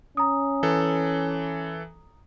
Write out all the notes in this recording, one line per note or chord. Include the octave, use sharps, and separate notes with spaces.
C#4 A#5 D#6
E3 A4